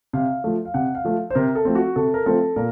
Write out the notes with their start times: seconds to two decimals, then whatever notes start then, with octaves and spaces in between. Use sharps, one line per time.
0.13 C3 F5
0.44 F3 A3
0.65 F5
0.74 C3 F#5
0.95 F5
1.04 F3 A3
1.30 C5
1.35 C3 A#4
1.55 A4
1.65 F3 A3 C4
1.75 F#4
1.96 C3 A4
2.14 A#4
2.26 F3 A3 C4 A4
2.56 A#2 A#4